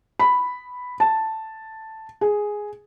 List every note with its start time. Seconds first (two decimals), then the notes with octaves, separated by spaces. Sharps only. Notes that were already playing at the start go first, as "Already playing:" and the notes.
0.19 B5
1.00 A5
2.21 G#4